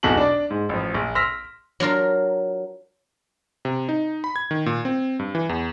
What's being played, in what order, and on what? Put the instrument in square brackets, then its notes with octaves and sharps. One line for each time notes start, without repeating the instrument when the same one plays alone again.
[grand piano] D1 B1 E2 F#4 A5 F#7
D4 D5
G#2
A1 F3
A#1
C6 E6 F6 A#6 B6
[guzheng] F#3 D4 F4 A#4
[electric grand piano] C3
D#4
B5
G#6
D#3
A#2
C4
G2
E3
E2